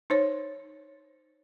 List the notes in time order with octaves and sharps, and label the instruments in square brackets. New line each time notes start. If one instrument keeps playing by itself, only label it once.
[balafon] D#4 C5 C#5